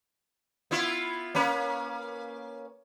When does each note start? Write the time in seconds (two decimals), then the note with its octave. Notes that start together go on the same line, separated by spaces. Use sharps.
0.71 B3 E4 F4
1.35 A#3 C#4 B4